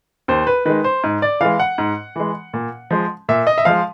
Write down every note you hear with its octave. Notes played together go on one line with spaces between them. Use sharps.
D#2 C5
B4
D#3 G#3 B4
C5
G#2
D5
E3 G#3 F5
F#5
G#2
E3 G#3
A#2
F3 G#3
A#2 E5
D#5
E5
F3 G#3 F5